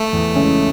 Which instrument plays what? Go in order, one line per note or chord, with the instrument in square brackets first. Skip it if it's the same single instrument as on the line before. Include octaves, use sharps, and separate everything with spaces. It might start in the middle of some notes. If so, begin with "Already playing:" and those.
Already playing: [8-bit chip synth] A3
[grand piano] E2
C#3 G#3 C#4 E4